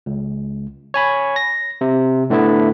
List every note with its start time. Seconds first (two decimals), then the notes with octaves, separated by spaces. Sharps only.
0.06 C#2
0.94 C#5 G#5 B5
1.36 A#6
1.81 C3
2.30 A2 D3 A3 B3 E4